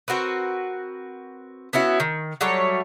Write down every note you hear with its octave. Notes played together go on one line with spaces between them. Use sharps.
C4 F#4 A#4 B4
B3 C#4 E4 F#4
D#3
F#3 G3 A3 C#5